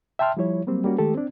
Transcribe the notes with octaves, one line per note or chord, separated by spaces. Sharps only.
E5 G5 A5 C6 F6
F3 G3 E4 C#5
F#3 G3 A#3 C4
G3 A#3 C#4 F#4
D#3 G#3 A3 G4 A4
C4 D4